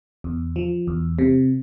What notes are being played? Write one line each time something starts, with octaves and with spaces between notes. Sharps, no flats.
E2
F3
E2
C3